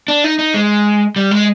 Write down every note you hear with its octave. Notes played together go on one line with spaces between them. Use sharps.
D4
D#4
D#4
G#3
G3
G#3